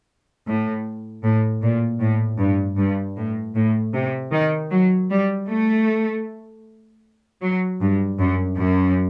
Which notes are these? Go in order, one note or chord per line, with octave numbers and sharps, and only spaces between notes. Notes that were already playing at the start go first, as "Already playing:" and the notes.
A2
A2
A#2
A2
G2
G2
A2
A2
C3
D#3
F#3
G3
A3
F#3
G2
F#2
F#2